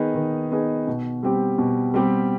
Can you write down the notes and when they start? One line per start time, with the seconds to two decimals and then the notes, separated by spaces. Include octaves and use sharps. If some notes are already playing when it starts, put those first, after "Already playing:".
Already playing: D#3 B3 D#4 G#4
0.15 D#3
0.51 B3 D#4 G#4
0.87 B2
1.23 G3 C4 G4
1.58 B2
1.94 G3 C4 G4